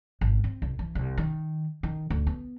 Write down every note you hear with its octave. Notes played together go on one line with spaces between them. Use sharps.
G#1
C4
C2
E3
C2
D#3
D#3
D2
B3